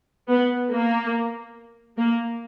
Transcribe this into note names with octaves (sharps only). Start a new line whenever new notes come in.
B3
A#3
A#3